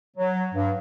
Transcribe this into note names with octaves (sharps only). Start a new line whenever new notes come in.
F#3
G2